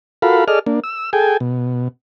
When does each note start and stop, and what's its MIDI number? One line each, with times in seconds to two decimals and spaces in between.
0.22 0.44 65
0.22 0.44 66
0.22 0.44 69
0.22 0.44 70
0.22 0.44 77
0.22 0.44 83
0.48 0.59 68
0.48 0.59 69
0.48 0.59 74
0.48 0.59 75
0.48 0.59 89
0.66 0.80 58
0.66 0.80 62
0.84 1.10 88
1.13 1.37 68
1.13 1.37 69
1.13 1.37 79
1.13 1.37 80
1.40 1.88 47